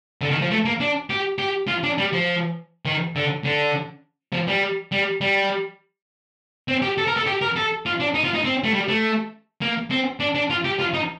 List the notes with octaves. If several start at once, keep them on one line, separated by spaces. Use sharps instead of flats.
D3
D#3
F3
A3
A#3
D4
G4
G4
F4
D4
G3
F3
D#3
D3
D3
F3
G3
G3
G3
C4
G4
A4
A#4
A4
G4
A#4
A4
F4
D4
D#4
F4
D#4
C4
A3
G3
A3
A#3
C4
D4
D4
F4
G4
F4
D#4